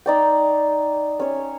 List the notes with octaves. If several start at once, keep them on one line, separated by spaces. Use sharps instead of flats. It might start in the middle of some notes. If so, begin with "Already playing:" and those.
D#4 D5 G5
C#4 C#5